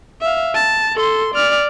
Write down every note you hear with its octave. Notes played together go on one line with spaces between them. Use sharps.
E5 F5
A5
A4 C6
D5 F6